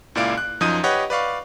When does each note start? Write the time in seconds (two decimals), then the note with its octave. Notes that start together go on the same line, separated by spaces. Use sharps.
0.15 C#2 A#2 E4 D5 F5 D7
0.37 F#6
0.61 F#2 F3 D#4 D#6 G6 D#7
0.83 G4 B4 C#5 D#5 F#5
1.10 B4 D5 F5 C#6